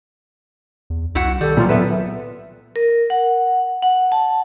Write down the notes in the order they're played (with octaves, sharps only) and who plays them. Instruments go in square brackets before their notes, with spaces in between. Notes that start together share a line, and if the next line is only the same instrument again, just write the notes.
[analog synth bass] E2
[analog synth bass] C2 [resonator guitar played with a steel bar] E4 F#4 F#5
[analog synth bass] D#3 [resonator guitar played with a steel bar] G3 [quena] A4
[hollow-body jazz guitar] A#2 F3 [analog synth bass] F#3 [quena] F4
[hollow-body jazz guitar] B3 A4 B4 [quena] E5
[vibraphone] A#4
F#5
F#5
A5